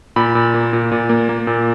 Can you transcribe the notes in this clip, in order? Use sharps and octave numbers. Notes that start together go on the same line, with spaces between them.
A#2 B5
A#2
A#3
A#2
A#2
A#3
A#3
A#2